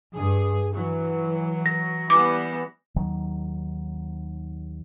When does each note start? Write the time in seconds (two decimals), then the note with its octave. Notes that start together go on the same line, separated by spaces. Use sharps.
0.14 G2 G#4
0.74 E3 F#3
1.66 A#6
2.10 E3 G3 B3 D6
2.96 D#2 D#3 F#3